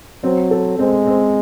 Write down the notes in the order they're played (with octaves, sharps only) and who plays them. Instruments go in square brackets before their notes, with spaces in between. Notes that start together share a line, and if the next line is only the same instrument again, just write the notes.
[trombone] F#3 [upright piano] C4
[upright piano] A4
[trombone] G#3 [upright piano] C4
[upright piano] C4